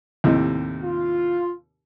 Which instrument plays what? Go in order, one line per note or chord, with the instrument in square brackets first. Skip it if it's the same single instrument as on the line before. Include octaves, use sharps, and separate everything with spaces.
[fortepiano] D#2 A2 C3
[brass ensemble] F4